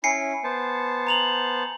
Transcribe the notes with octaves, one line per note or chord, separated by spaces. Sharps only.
C#4 E4 G#5 C7 C#7
B3 C5 A5
A#5 F7 F#7